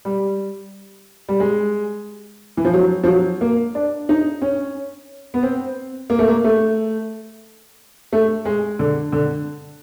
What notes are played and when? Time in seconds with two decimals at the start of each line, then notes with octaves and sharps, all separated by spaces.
0.05 G3
1.28 G3
1.40 G#3
2.57 E3
2.65 F3
2.74 F#3
3.03 F3
3.07 F#3
3.41 A#3
3.75 D4
4.09 D#4
4.42 C#4
5.34 B3
5.43 C4
6.10 A#3
6.19 A3
6.28 A#3
6.44 A3
8.13 A3
8.45 G#3
8.79 D3
9.12 D3